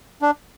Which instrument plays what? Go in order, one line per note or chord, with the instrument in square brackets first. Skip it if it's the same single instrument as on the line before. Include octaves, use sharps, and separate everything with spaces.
[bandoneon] D4